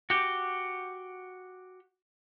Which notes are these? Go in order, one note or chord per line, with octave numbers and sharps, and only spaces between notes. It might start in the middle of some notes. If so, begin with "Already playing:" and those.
F#4 G4